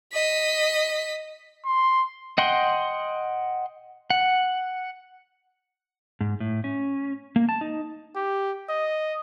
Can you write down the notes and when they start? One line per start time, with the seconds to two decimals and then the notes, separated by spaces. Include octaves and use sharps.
0.13 D#5 B6
1.66 C6
2.38 D#5 F#5 G5 C6
4.10 F#5
6.21 G#2
6.40 A2
6.64 C#4
7.36 A#3
7.49 A5
7.61 D#4
8.16 G4
8.69 D#5